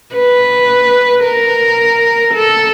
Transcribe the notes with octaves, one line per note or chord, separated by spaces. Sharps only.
B4
A#4
A4